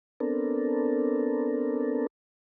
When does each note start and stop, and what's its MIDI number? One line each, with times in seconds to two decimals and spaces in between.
0.20 2.07 59
0.20 2.07 60
0.20 2.07 62
0.20 2.07 69
0.20 2.07 70